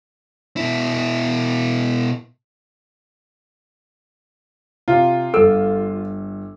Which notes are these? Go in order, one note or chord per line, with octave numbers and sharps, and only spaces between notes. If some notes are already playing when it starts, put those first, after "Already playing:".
B2 E4
C3 F4
G1 A4 E6